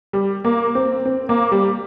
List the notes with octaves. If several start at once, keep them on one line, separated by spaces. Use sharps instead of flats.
G3
A#3
C4
C4
A#3
G3